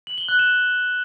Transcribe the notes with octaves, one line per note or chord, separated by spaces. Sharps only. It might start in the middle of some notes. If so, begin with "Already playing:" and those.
F#7
G7
F#6
E7